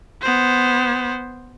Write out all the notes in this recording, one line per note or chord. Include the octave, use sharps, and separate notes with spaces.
B3 C5